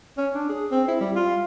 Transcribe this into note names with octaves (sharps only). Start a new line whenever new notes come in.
C#4
D4
G#4
C4
E4
G3
F4